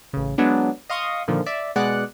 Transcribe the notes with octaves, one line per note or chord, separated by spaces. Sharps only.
A1 C#3
F#3 G#3 B3 D4
D#5 F5 C6 C#6 D#6
A#2 D3 D#3 F3
D5 E5
B2 G#3 G#4 D5 F#5 F#6